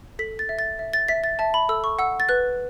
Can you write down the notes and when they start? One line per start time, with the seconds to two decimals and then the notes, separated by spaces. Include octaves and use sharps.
0.19 A4 B6
0.39 A6
0.49 E5
0.59 A6
0.79 E5
0.93 A6
1.08 E5 B6
1.24 A6
1.39 E5 A5
1.54 B5
1.69 A4 E6
1.84 C#6
1.99 F#5 E6
2.20 A6
2.29 B4 F#6